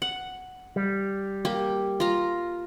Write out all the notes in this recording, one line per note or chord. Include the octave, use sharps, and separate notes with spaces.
F#5
G3
A#3 G4
F4 A#5